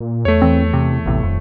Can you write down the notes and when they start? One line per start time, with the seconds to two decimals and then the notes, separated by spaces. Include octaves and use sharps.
0.01 A#2
0.25 E2 A3 C#5
0.42 E3 C4
0.73 C3
1.06 A1 A2 C3
1.23 D#1 F2